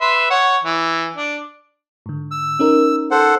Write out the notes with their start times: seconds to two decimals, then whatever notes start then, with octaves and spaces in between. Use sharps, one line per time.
0.01 B4 E5 C6
0.30 C#5 F#5
0.64 E3
1.16 D4
2.06 G#2 D3
2.31 E6
2.59 C#4 D#4 A#4
3.11 A4 C5 F#5